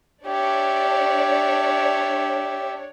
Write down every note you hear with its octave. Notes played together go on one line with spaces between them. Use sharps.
D4 G4 C#5 D5 E5